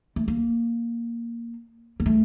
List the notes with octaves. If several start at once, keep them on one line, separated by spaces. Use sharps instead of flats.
A3
A#3
A#3
A3